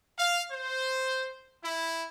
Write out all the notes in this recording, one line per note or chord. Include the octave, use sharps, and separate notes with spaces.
F5
C5
E4